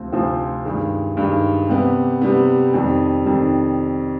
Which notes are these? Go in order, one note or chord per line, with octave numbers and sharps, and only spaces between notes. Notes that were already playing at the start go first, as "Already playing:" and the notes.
Already playing: D2 C3 F3 C4
D2 C3 F3 C4
G2 D#3 G#3
G2 D#3 G#3
C3 G3 B3
C3 G3 B3
F2 D#3 G3
F2 D#3 G3